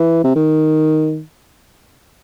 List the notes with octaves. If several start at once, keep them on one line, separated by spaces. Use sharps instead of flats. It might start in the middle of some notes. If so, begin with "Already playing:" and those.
Already playing: E3
C3
D#3